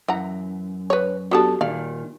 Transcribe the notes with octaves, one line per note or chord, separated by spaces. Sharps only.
F#2 E3 F#5 A#5
B4 C#5
B3 D4 F#4 G4 A4
A#2 D#3 D5 F5